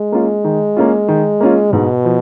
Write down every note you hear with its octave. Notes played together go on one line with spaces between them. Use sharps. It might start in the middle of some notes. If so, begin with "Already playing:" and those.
Already playing: G#3
A#3 C#4 F4
D#3
A#3 C#4 F4
D#3
A#3 C#4 F4
G#2 B2
F3